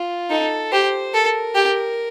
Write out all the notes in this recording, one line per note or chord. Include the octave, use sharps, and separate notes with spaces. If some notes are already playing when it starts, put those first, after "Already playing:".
Already playing: F4
D#4 A4
G4 C5
A4 A#4
G4